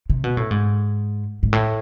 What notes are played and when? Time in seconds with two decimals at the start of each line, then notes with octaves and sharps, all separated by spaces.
0.10 C3
0.24 B2
0.37 A2
0.51 G#2
1.43 G#2
1.53 A2